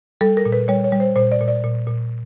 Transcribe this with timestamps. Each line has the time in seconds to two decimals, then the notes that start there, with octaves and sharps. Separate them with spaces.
0.21 G3 A4
0.37 A#4
0.45 A#2
0.53 B4
0.68 G3 C#5
0.84 C#5
0.92 G3
1.00 C5
1.16 A#2 C5
1.32 D5
1.41 A#2
1.48 D5
1.64 A#2
1.87 A#2